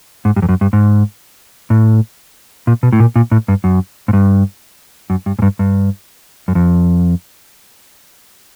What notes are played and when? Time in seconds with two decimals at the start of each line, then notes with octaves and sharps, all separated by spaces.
0.25 G#2
0.36 G2
0.42 F2
0.49 F#2
0.61 G2
0.73 G#2
1.70 A2
2.67 A#2
2.83 B2
2.93 A2
3.00 A#2
3.16 A#2
3.31 A2
3.48 G2
3.64 F#2
4.08 G#2
4.13 G2
5.10 F#2
5.26 G2
5.39 G#2
5.42 G2
5.59 G2
6.48 F#2
6.55 F2